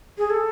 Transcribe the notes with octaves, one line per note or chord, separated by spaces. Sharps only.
G#4
A4